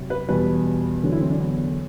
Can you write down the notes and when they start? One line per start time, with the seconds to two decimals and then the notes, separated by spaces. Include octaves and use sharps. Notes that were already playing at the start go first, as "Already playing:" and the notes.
Already playing: C3 F#3
0.10 B4
0.29 E2 B2 G3 B4
1.03 E2 D3 F#3
1.12 E4
1.21 C4
1.30 D4
1.40 B3